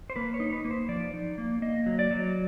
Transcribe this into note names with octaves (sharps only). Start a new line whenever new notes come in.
C5
A#3 B4
C#5
D#4
B4
A#3
C5
F3 D5
D#4
A#3
A#3 D#5
F#3
D5
F#3